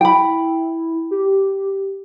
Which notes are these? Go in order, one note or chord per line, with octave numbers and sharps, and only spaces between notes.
E4 G5 B5
G4